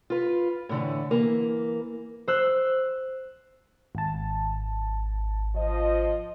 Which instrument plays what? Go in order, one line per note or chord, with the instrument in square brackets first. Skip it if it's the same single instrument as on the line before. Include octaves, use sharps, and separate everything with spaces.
[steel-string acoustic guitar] F4 B4
A2 D3 E3
E3 A#3
[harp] C5 E6 F#6
[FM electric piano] G#1 A5
[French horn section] F3 D#5